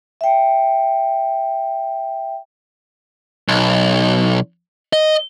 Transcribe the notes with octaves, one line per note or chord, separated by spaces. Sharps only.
E5 G5
B1
D#5